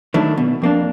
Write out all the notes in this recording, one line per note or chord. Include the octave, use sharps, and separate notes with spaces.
D#3 F#3 A3 D4 E4
B2
F2 A#3 D4